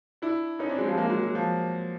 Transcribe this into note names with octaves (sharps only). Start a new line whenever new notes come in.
D4 E4
C#4 D#4
C4 D4
F#3 G#3
F3 G3
G#3 A#3
F#3 G#3
F#3
F3